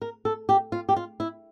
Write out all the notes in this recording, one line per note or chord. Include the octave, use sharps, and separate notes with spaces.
A#4
A4
G4
F4
G4
F4
E4